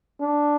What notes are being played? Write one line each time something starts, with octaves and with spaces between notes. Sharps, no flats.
D4